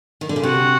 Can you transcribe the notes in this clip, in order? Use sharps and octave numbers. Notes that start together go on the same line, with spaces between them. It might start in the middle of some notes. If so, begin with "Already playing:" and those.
D#3
D3
C#3
C3 F#4